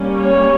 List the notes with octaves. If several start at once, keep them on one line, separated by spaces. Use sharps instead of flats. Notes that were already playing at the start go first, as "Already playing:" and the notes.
Already playing: G3 A#3 C#4
C#5